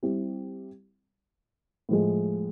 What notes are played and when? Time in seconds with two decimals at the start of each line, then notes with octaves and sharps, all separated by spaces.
0.03 G3 C4 E4 G4
1.89 A2 F3 G#3